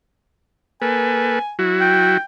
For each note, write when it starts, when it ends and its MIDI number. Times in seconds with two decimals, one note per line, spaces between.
0.82 1.39 58
0.82 1.39 69
0.82 1.39 71
0.82 1.53 80
1.59 2.17 54
1.59 2.17 64
1.59 2.17 66
1.81 2.23 79